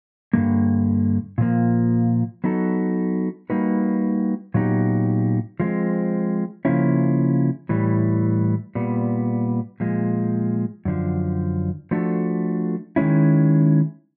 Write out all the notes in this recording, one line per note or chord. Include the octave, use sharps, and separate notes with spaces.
G2 D3 F3 A#3
A#2 F3 A#3
F#3 B3 D#4 F#4 A4
G3 A#3 D#4 F#4 B4
A#2 F#3 B3 D#4 G4
F3 G#3 C4
C#3 F3 A#3 C#4 E4
A2 E3 G3
A#2 G3 B3
A#2 F3 G#3
F#2 D3 F3
F3 A3 D4 F#4 A4
D#3 G#3 C#4 E4